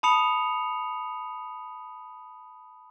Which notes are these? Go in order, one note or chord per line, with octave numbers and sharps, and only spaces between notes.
A5 B5 D#6 C#7 F7